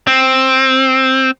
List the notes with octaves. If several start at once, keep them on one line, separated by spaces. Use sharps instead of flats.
C4